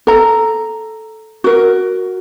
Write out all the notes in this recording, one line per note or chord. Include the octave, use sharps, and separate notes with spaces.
A4 A#5
F#4 A#4